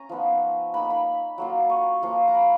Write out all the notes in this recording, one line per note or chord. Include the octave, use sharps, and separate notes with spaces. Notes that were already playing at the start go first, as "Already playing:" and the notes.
Already playing: C#4 G#5 A#5
F3 B3 D#4
A#3 D#4 B5
B5
F#3 A#3 F4
C#6
F3 A#3 F4
A#5
B5